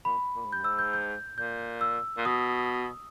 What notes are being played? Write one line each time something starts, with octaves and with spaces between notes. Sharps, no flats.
A#2 B5
A#2
G#2
G2 G6
G#2 E6
G6
G6
A#2 G6
E6
A#2
B2 D#6